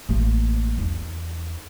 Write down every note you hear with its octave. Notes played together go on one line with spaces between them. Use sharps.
A1 A#3
E2 D#4